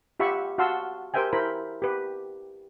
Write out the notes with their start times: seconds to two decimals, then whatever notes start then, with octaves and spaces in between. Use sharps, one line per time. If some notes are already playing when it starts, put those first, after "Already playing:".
0.20 F4 G4 E5 F#5 B5 C#6
0.58 F#4 F5 F#5 A5 C6 E6
1.14 G4 A#4 C5 E5 G5 G#5
1.33 E4 A#4 C5 B5
1.82 G4 B4